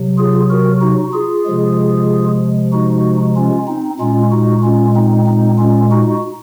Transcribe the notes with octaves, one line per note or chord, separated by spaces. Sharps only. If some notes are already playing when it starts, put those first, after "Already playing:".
Already playing: C3 F#3
F4 G#4
F#4 A#4
D#4 F#4
F4 G#4
C3 F3 G#3
D#4 F#4
C#4 F4
C4 D#4
A#2 G#3 C#4 F4
D#4 F#4
C#4 F4
C4 D#4
C4 D#4
C#4 F4
D#4 F#4